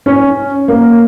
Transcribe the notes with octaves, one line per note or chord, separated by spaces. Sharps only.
C#4
A#3